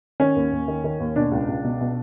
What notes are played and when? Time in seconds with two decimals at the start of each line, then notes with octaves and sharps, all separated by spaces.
0.20 D#3 C#4
0.36 D#2
0.52 D#2
0.68 D#3
0.84 D#3
1.00 D#2
1.16 B2 D4
1.32 C#2
1.48 C#2
1.64 B2
1.81 B2